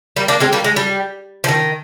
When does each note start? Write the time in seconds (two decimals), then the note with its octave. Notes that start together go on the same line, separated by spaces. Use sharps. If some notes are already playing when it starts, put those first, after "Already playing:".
0.16 G3 A#3
0.28 A#3 D4
0.40 G#3 C4
0.53 G3 A#3
0.64 G#3
0.76 G3
1.44 F3
1.48 D#3